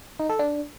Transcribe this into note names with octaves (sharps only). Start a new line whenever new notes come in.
D#4
A4
D4